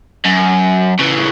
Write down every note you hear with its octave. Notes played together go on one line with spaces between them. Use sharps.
F#2
C#3 E3